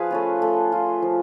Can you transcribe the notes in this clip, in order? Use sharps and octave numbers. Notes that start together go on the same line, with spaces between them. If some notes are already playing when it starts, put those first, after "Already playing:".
Already playing: F3 G#4 B4 F5
A3 C#4 F4
A3
F4
F3